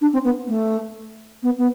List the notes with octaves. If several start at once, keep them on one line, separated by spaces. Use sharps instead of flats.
D4
C4
B3
A3
B3
B3